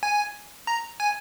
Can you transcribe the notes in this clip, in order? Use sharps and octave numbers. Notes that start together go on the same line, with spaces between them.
G#5
A#5
G#5